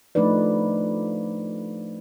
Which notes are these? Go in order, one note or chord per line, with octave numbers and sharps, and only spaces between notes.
F3 A3 D4 D#4 B4 D5